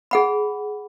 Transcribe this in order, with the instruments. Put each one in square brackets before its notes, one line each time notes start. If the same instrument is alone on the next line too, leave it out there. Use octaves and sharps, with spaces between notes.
[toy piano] G#4 F#5 B5